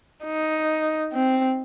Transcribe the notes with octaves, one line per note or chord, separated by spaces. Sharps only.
D#4
C4